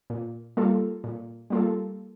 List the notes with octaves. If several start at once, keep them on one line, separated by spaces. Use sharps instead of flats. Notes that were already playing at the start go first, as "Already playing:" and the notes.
A#2
G3 A#3 F4 A4
A#2
G3 A#3 F4 A4